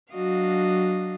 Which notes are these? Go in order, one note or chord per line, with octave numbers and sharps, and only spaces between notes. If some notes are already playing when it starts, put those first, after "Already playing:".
F#3 D4 F#4 D#5 F5